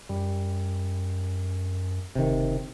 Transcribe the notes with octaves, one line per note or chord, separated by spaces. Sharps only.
F#2 G3
F#1 C3 D#3